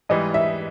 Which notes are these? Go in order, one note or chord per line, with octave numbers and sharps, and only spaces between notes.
G#2 E3 G3 D#5
E5